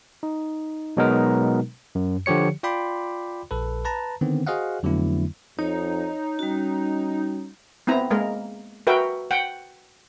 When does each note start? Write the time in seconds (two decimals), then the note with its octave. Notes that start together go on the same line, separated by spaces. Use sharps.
0.23 D#4
0.97 B2 F#3 G#3 B3 D#4 A#4
1.95 F#2
2.26 D3 F3 G4 C#5 C#7
2.63 F4 D5 G5 B5 C6 D6
3.51 A#1 A4 B4
3.85 B4 A5 A#5
4.21 D3 D#3 B3 C4
4.47 F#4 G#4 C5 D#5 F5 F#5
4.83 F2 D3 F#3 A3 B3 E4
5.59 F2 D#4 C#5
6.39 G3 C#4 F#4
7.87 B3 C4 E4 A#5
8.11 G#3 A#3 A#4
8.87 F#4 A#4 B4 E5 G5
9.31 F#5 G5